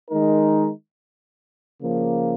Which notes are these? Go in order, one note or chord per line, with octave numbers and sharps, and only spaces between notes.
D#3 G#3 D#4 A#4
C#3 F3 A#3